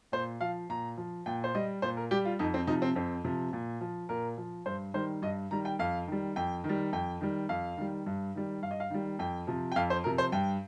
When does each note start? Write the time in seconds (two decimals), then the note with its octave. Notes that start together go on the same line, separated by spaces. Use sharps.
0.12 A#2 C5
0.41 F3 F5
0.69 A#2 A#5
0.97 F3
1.26 A#2 G5
1.44 C5
1.55 G3 D#5
1.82 A#2 C5
1.97 A#4
2.11 G3 G4
2.25 F4
2.39 F2 D#4
2.54 C4
2.67 C3 F3 D#4
2.82 C4
2.96 F2 C4
3.25 C3 F3
3.53 A#2
3.81 F3
4.09 A#2 A#4
4.38 F3
4.66 G2 C5
4.94 D#3 G3 C5
5.22 G2 D#5
5.51 D#3 G3 A#5
5.65 G5
5.79 F2 F5
6.07 D#3 G3
6.36 F2 G5
6.64 D#3
6.69 G3
6.93 F2 G5
7.21 D#3 G3
7.49 F2 F5
7.77 D#3 G3
8.06 G2
8.35 D#3 G3
8.62 G2 F5
8.71 D#5
8.80 F5
8.90 D#3 G3
9.19 F2 G5
9.47 C3 F3
9.72 G5
9.76 F2 F5
9.90 C5
10.04 C3 F3 A#4
10.18 C5
10.32 G2 G5